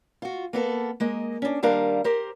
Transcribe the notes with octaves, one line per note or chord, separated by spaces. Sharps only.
F4 F#4
A#3 B3 A4
G#3 A#3 D#5
C#4 D4
D#2 G3 D4 A#4 F5 A#5
G4 A#4 C5